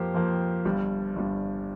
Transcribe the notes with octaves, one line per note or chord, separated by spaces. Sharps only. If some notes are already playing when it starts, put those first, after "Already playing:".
Already playing: F2 F3 A#3 G4 C5
F2 F3 A#3
G1 G2 G3
G1 G2 G3